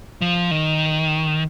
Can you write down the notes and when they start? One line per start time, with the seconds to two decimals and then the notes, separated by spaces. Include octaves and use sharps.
0.21 F3
0.51 D#3